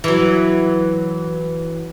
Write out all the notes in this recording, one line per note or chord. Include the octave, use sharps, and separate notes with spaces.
E3 F#3